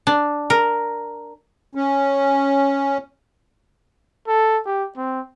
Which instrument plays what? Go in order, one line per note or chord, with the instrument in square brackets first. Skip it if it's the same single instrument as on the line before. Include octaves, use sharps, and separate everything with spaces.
[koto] D4
A#4
[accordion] C#4
[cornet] A4
G4
C4